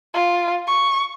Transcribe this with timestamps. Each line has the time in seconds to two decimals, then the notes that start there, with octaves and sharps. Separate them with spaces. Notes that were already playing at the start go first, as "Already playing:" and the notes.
0.14 F4
0.67 C#6